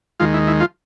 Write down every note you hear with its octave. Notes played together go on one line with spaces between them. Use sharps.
D#2 D#3 F3 G#3 F4
E4
E4
F3 F4